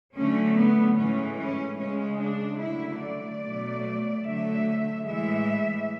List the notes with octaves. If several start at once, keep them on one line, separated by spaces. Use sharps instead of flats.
D3 F#3 A3 C#4
B3
A2 E3 G#3 C#4
C#4
C#3 G#3 C#4
D4
D3 F#3 A3 E4
D5
B2 F#3 A3
D3 F#3 A3 E5
A2 E3 G#3 E5